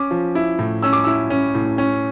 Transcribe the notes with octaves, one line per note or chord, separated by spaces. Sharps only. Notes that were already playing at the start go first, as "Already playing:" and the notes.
Already playing: C#4 D6
F3
E4
A2
C#4 E6
D6
E4 E6
C#4
A2
C#4